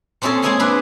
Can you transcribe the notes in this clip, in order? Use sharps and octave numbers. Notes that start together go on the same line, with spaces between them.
A#2 C4 C#4 E4 G#4 A4
G#3 A#3 E4 G#4 G#5 C6
D4 E4 B4